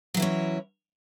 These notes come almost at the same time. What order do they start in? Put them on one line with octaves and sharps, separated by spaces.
F#3 E3 E4 C#4